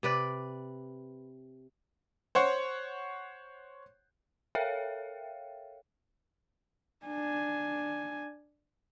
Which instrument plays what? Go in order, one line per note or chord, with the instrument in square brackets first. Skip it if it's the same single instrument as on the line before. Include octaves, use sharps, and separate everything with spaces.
[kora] C3 B4 D5
[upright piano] C5 C#5 F#5
[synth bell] A4 A#4 C#5 E5 F5 G5
[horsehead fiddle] D4 G#5